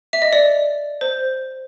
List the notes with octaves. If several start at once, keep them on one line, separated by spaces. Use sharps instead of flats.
E5
D#5
D5
C5